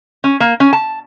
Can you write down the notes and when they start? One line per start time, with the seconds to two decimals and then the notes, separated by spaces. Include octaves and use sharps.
0.24 C#4
0.40 A#3
0.60 C#4
0.73 A5